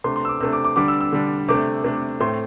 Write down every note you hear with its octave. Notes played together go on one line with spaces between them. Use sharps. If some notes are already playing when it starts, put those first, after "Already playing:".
C3 A3 D4 C6
C6
E6
D6
C3 A3 D4 E6
D6
D6
D3 G3 D4 D6
E6
E6
D3 G3 D4
C3 A3 D4 D6
C3 A3 D4
A2 A3 C4 C6